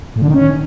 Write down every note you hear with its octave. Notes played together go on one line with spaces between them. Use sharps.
A2
D3
D#3
C#4